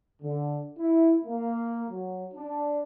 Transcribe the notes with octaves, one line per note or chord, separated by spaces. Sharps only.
D3
E4
A#3
F#3
D4